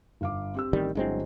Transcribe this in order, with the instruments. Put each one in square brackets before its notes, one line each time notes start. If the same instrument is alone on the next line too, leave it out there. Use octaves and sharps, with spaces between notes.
[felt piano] G1 F5 D6
C4 G4 E6
[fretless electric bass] A1 D#3 G3
[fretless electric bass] G1 G#3 C4 [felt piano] D3 F#3 E4